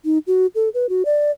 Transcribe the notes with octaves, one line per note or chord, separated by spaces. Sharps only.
D#4
F#4
A4
B4
F#4
D5